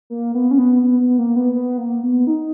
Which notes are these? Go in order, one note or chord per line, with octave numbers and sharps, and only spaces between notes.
A#3
B3
C#4
B3
B3
B3
A#3
B3
B3
A#3
B3
D#4